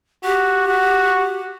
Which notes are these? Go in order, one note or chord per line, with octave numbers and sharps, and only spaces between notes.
F#4 G4
F#4